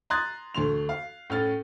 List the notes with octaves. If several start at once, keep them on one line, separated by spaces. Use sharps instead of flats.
A#5 C6 D#6 F#6 G#6 A6
D2 A3 C6 F7
F5
A2 C#4 F6 A6